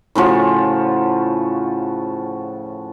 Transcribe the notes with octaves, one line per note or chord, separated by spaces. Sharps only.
A2 C#3 F3 F#4